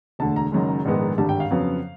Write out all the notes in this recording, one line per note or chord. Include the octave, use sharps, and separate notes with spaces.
E1 D2 D3 A5
A#5
F#1 F#2 D#3 G#3
A#1 G#2 D#3 G#3 B3
G#1 G2 D3 G3 A5
G5
F5
F2 C#3 F#3 B3